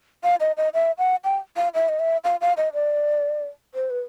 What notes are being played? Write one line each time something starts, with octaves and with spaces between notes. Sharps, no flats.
F5
D#5
D#5
E5
F#5
G5
F5
E5
D#5
E5
F5
F5
D#5
D5
C5
B4